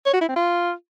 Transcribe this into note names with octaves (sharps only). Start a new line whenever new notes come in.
C#5
F#4
E4
C4
F4